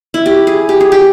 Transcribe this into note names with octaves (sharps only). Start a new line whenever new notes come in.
E4
G4
G#4
G4
G#4
G4